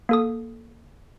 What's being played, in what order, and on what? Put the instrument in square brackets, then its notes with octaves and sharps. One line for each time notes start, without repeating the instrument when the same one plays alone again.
[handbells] A#3 A4 D#6